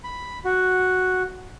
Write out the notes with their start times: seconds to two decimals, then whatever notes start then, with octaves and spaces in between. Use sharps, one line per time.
0.04 B5
0.45 F#4